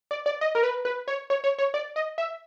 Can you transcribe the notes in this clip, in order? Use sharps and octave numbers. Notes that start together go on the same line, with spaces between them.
D5
D5
D#5
A#4
B4
B4
C#5
C#5
C#5
C#5
D5
D#5
E5